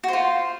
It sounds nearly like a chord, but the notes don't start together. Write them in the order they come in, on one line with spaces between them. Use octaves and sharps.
F#4 C5 F4